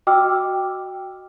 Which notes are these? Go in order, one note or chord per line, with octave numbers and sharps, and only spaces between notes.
F#4 D#5 G5 D6 E6 F6